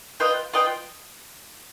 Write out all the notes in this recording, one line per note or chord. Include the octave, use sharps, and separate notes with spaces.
F4 B4 D#5 G5
F4 B4 D#5 G5